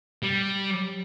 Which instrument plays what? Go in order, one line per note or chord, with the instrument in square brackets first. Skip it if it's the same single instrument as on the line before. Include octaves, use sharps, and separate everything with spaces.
[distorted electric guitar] G3